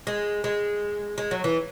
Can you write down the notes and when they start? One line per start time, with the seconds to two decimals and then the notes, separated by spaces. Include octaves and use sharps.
0.07 G#3
0.44 G#3
1.18 G#3
1.31 F#3
1.44 E3